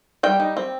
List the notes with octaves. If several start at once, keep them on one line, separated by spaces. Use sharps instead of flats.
G3 G5
D#4
C4